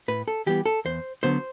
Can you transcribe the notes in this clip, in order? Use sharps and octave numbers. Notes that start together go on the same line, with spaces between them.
A2 B4
A4
E3 G3 B3 G4
A4
E2 C5
D3 F#3 B3 C5